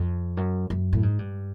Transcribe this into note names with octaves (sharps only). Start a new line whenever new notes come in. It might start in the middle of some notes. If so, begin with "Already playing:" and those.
Already playing: F2
F#2
F#2
A2
G#2
G2